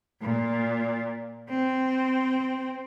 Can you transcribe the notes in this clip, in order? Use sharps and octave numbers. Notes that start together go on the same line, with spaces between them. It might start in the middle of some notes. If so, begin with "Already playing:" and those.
A#2
C4